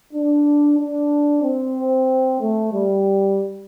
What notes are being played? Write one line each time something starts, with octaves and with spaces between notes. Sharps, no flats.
D4
D4
C4
A3
G3